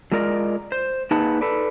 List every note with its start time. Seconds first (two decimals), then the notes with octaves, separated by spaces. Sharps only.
0.12 F#3 G#3 F4 A#4 D5 D#5
0.72 C5
1.11 A#3 D#4 G#4 B4 F#5 A5
1.41 A4 B4 D5